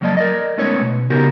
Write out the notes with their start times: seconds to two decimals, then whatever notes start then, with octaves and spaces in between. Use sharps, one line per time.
0.01 F2 F#3 A#3 D5 D#5 A5
0.17 A#4 D5 D#5
0.58 G#3 A3 B3 C#4 D#4 C#5
0.81 B2
1.10 C#3 B3 D#4 F#4 G4 A#4